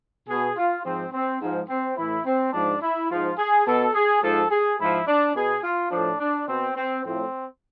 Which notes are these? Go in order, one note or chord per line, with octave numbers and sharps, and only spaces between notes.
B2 G#4
F4
G#2 F3 C4
C4
G#2 F3
C4
A2 E3 E4
C4
G#2 F3 D4
E4
G#2 F3 F4
G#4
B2 A4
G#4
G#2 F3 A4
G#4
G#2 F3 E4
D4
B2 G#4
F4
A2 F3 D4
D4
B2 C4
C4
A2 F3 C4